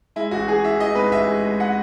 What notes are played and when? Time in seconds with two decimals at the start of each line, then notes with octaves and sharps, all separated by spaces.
0.16 G#3 E4
0.31 A1 F#4
0.47 E3 G#4
0.64 E3 E5
0.79 E3 D#5
0.95 G#2 B4
1.11 A1 E5
1.27 G#3
1.44 G#3
1.60 F#5